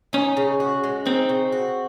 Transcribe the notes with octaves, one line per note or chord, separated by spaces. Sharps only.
C#4 D#4
C#3
F#4
G#3
C4 D#4
C#3
F#4